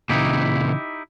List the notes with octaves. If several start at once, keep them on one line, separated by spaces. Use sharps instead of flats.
A#2 C#3 E3 D#4 E4 G4